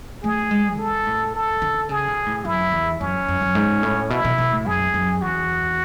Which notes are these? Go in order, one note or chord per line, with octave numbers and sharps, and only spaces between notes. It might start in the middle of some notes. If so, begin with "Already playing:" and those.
A3 G#4
G#3
B2 A4
A2
A4
D3
C#3 G#4
B2
A2
F#2 E4
E2
F#2 C#4
F#2
F#2
G#2
A2
B2 E4
B2
B2
A2
F#2 G#4
F#2
E2 F#4